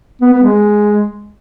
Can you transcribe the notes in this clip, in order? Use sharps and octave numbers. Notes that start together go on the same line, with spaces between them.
B3
B3
G#3